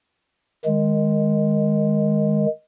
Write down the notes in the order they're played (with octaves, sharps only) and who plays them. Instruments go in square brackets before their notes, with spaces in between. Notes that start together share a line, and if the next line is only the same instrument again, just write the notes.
[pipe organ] D#3 G#3